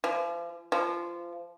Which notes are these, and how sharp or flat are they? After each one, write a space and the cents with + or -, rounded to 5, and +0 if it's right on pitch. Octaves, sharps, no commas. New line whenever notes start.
F3 -40
F3 -20